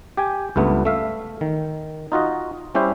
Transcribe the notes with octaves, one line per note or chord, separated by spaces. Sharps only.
G4 G5 G#5
C#2 G2 A3 B3
A3 E5 F5
D#3
D#4 F4 F#4 D#5
G3 C#4 E4 G4 C5